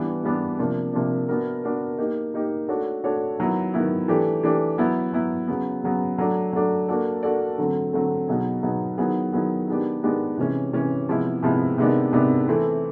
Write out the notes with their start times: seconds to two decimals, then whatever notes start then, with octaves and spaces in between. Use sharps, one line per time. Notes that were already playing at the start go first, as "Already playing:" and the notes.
Already playing: E3 G3 B3 D4
0.23 E3 G3 B3 D4
0.58 C3 F3 A#3 D4
0.93 C3 F3 A#3 D4
1.29 B3 D4 F#4 A#4
1.64 B3 D4 F#4 A#4
1.98 A#3 D#4 G4
2.34 A#3 D#4 G4
2.68 A3 D4 F#4 A4 C#5
3.04 A3 D4 F#4 A4 C#5
3.38 D#3 F#3 B3 E4
3.74 D#3 F#3 B3 E4
4.08 E3 A3 D4 G4
4.43 E3 A3 D4 G4
4.78 F#3 B3 E4
5.13 F#3 B3 E4
5.48 C#3 F#3 B3
5.83 C#3 F#3 B3
6.18 F#3 A3 D4
6.53 F#3 A3 D4
6.88 A#3 D4 F#4 A4 D5
7.23 A#3 D4 F#4 A4 D5
7.58 D3 F#3 A3 C4
7.93 D3 F#3 A3 C4
8.28 B2 F#3 B3 D#4 G#4
8.63 B2 F#3 B3 D#4 G#4
8.98 D#3 F#3 B3 E4 G#4
9.33 D#3 F#3 B3 E4 G#4
9.68 D#3 G#3 B3 D4 G4
10.03 D#3 G#3 B3 D4 G4
10.38 C3 E3 G#3 C#4
10.73 C3 E3 G#3 C#4
11.09 C3 F3 G#3 B3 E4
11.43 C3 F3 G#3 B3 E4
11.78 C3 D#3 G#3 B3 D4
12.13 C3 D#3 G#3 B3 D4
12.48 E3 A3 C4 E4